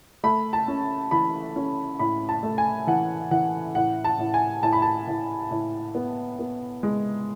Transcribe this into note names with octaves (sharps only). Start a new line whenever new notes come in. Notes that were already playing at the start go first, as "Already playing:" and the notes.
A3 B5
A5
C#4
E3 B5
C#4
A2 B5
A5
A3
G#5
E3 F#5
E3 F#5
A2 F#5
A5
A2
G#5
A2 A5
B5
A5
A2
A2
B3
B3
G#3